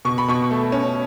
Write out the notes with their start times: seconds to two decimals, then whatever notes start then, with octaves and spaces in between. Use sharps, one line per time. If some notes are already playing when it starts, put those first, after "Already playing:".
0.05 B2 C#6
0.18 B5
0.28 B2 C#6
0.51 A3
0.72 C#4